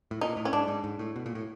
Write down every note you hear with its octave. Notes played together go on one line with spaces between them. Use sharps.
A2
A#2 D#4
A2
C#4
G#2 D4
G#2
G#2
A2
B2
A#2
A2